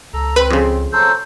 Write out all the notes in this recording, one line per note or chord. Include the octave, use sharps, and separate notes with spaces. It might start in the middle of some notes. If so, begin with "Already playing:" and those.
C#2 A4 A#5
C4 B4
F2 C#3
F#3 A4 C5